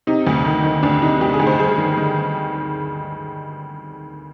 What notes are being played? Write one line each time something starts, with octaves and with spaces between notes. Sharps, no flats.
C3 D#4
D2
D#3
D#3
D2 D4
C3 D#4
D2 G4
G#4
D2
C5
G2 G#4
D#3
D#3